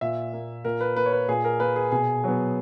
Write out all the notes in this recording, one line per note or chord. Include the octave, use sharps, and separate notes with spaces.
A#2 E5
A#3
A#2 A#4
B4
A#3 B4
C#5
B4
A#2 G#4
A#4
A#3 B4
G#4
B2 G#4
F#3 B3